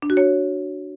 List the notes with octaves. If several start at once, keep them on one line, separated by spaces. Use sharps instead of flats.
D4
F#4
C#5